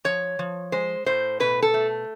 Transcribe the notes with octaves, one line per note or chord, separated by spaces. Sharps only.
F3 C#5
F3
G#3 C5
A2 C5
B2 B4
A4
A3